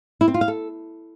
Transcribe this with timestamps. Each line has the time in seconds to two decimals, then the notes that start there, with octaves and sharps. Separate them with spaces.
0.21 E4
0.28 C4
0.34 F4
0.41 F5
0.48 A4